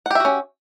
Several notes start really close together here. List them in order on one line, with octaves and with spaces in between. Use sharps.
F#5 G4 E5 F#4 C#4